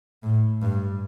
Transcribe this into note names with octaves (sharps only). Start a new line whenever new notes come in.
A2
G2